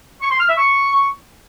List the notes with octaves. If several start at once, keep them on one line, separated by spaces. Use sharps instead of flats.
C#6
C6
F6
E5
C#6